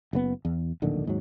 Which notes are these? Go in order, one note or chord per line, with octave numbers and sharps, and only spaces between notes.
F#1 C#3 B3
E2
D1 A#1 D3 D#3
D#2 G#2 F#3